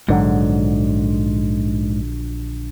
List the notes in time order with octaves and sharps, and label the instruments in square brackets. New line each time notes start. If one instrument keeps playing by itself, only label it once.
[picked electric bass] A#1 D3 F#3 [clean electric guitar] G#2